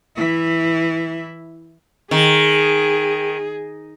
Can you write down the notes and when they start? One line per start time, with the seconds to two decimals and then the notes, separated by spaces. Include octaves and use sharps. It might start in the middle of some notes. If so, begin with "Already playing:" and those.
0.17 E3 E4
2.11 D#3 G#4